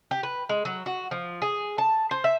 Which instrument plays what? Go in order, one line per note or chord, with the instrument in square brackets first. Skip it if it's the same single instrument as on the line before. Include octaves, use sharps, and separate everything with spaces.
[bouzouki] G4
B4
G#3
F#3
F#4
F3
G#4
A5
C5
E5